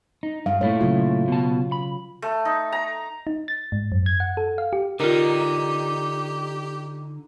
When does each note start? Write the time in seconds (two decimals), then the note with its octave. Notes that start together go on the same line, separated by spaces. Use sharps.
0.23 D#4
0.46 G2 F5
0.61 A#2 A3 E4 C#5
0.81 C#3 F#3 F4
1.28 B2 A5
1.72 B5
2.22 A3
2.45 D#4
2.72 A#5
3.27 D#4
3.48 A6
3.72 G#2
3.92 F#2
4.06 G#6
4.20 F#5
4.37 A4
4.58 F5
4.73 G4
5.00 D3 D#4 F4 G4 A#4